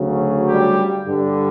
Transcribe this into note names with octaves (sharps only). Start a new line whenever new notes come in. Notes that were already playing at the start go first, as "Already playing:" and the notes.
Already playing: D2 C#3 F#3
G3 G4
G2 D3 G3